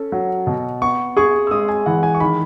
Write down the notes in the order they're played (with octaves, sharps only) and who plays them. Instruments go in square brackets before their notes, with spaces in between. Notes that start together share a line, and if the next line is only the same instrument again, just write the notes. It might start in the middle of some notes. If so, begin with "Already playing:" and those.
Already playing: [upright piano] C#4 A4
F#3
B2
[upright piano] B3 [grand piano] C#6
[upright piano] G#4 [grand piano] C#6
[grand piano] E6
[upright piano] G#3 [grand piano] D#6
[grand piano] G#5
[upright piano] E3 [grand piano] F#5
[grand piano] G#5
C#6
[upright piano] D#3 [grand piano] B5